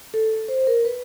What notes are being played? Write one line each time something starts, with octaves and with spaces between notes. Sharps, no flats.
A4
C5
A#4
B4